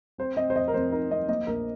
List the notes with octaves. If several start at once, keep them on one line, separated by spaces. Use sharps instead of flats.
C4 C5
C4 D#5
C5
F2 D#5
A#4
F2 C5
D#4 A#4
F2 D#5
A#3 D#5
A#1 A#4